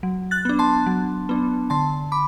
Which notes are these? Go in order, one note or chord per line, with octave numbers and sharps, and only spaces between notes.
F#3
F#6 A6
B3 D4
A5 C6
F#3
B3 D4
D3 A5 C6
B5 D6